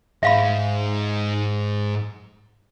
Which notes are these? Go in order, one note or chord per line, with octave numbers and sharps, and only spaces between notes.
G#2 E5 F5 B5